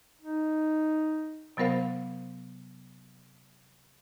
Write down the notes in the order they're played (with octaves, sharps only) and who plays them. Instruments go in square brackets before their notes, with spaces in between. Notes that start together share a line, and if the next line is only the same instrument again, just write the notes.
[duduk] D#4
[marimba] C3 F#3 B3 A#4 C5 F5